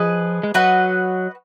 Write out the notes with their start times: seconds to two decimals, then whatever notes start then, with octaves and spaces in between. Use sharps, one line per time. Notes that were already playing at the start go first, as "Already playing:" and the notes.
Already playing: F3 G#4 B4 D#5
0.43 G#3
0.54 F#3 F#4 B4 D#5 F#5